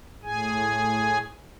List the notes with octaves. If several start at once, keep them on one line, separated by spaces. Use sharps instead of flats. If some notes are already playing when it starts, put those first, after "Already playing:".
A2 G#4 G#5